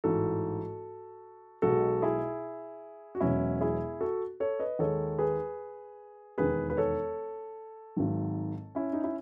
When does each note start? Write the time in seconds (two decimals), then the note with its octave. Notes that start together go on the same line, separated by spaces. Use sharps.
0.04 A1 G#2 E3 F#4 A4
1.62 B1 B2 G#3 F#4 A4
2.02 E4 G#4
3.15 F#4
3.20 E1 E2 B2 F#3 C#4 E4
3.61 E4 G#4
4.01 F#4 A4
4.40 A4 C#5
4.60 B4 D#5
4.79 D#2 D#3 G#3 A4 C#5
5.18 G#4 B4
6.38 E1 D#2 D#3 G#4 B4
6.70 B4
6.77 A4 C#5
7.96 G#1 G#2 D#3 F#3
8.75 C#4 E4
8.93 D#4
9.04 E4